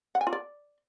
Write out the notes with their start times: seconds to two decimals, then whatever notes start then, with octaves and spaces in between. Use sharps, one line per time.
0.15 F#5
0.21 G#5
0.27 F4
0.33 D5